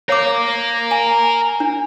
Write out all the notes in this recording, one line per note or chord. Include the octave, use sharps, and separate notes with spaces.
A#4 C#5 F5 D6
G#5
D4